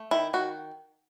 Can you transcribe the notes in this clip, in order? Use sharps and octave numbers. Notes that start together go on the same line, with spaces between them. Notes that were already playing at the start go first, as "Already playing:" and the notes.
Already playing: A3
D#3 E4
D#3 F#4